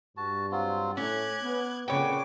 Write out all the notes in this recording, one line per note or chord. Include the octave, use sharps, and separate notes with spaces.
G2 F#4 A5
F#3 C4 F4
A2 C#4 D6 F#6 G#6
B3
F2 A#2 C#3 B3 B4 C#5 G5 D6